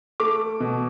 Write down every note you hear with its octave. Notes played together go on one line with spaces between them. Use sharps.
A3 D6
B2